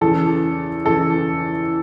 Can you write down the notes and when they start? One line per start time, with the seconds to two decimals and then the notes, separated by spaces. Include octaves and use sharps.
0.01 E2 C#3 E3 A4
0.85 E2 C#3 E3 A4